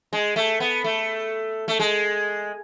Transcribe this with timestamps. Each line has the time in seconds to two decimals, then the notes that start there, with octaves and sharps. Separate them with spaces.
0.13 G#3
0.36 A3
0.60 B3
0.84 A3
1.68 A3
1.80 G#3